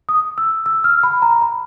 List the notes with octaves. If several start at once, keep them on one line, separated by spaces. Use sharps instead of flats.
D#6
E6
E6
F6
B5
A#5
B5